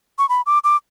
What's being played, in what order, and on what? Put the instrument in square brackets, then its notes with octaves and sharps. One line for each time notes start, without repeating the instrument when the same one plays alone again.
[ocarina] C#6
B5
D6
D6